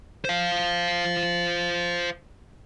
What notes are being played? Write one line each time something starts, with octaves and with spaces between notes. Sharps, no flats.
C5 F5